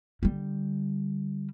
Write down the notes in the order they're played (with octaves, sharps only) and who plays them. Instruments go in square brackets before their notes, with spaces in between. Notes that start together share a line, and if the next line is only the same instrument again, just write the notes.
[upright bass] D3 G3